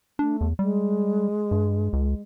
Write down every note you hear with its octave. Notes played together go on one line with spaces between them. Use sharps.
A3 D4
E2
G3 G#3
G2
C#2